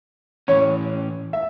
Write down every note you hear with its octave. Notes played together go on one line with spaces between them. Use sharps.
A2 E3 C#4 C#5
E5